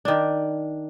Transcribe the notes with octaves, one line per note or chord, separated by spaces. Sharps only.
D#3 D4